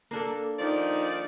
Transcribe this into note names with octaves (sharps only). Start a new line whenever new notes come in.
A#3 D4 A4
D#3 F3 D#4 D5